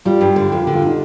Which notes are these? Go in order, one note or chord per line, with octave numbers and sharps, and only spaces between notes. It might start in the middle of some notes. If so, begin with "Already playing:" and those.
G3 F4
G2 G4
D3 G4
F2 F4
D3 G4
F4
D#4